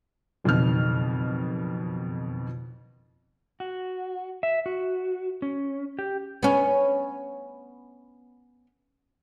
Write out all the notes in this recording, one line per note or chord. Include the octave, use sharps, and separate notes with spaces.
F#1 F2 B2 D#3 F6
F#4
E5
F#4
C#4
G4
B3 C#4